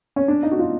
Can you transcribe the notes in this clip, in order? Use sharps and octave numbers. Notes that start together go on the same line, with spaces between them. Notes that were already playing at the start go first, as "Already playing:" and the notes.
C#4
D4
D#4
F#4
F4